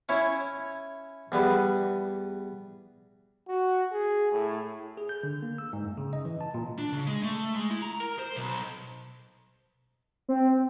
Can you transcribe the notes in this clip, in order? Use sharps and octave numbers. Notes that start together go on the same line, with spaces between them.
C#4 E4 C#5
E2 G3 B3 B4
F#4
G#4
A2
G#4
G6
D3
A#3
E6
G#2
F#2
C#3
D#5
E3
A5
A#2
D4
C#3
G#3
A3
G#3
E4
A#5
A#4
C5
B1
C4